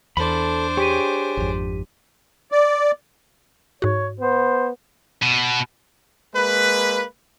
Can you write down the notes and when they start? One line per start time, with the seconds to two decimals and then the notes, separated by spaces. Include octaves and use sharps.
0.17 E2 D4 A4 C5 B5
0.77 G4 G#4 C#5 G5 B6 D#7
1.37 G#1 F2
2.52 D5
3.82 G#2 F#4 C#5
4.20 B3 C5
5.23 B2
6.34 G#3 A#3 B4